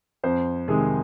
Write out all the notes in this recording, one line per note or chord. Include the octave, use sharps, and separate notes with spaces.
F2 C5
C3 D#3 G#3 G#4